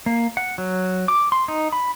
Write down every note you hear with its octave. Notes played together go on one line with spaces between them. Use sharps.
A#3
F#5
F#3
D6
C6
D#4
B5